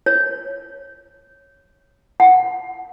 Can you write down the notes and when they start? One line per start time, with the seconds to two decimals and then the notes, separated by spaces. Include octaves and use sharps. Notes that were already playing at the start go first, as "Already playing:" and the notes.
0.06 C#5
2.20 F#5